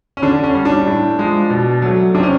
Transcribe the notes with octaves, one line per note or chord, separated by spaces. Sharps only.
C#4
D3 D4
C#4
G3
D4
A2
F3 G#3
B2
F#3 A3
C3 D4
C#4